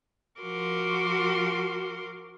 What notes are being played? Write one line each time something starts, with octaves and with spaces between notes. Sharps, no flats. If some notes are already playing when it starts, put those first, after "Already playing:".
F3 F#4 A#4 C6 D6